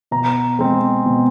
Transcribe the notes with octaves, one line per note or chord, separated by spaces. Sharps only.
B2 A#5
G#3 C4
B2